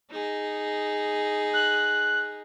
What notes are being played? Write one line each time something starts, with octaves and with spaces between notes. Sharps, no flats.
D#4 G#4
F#6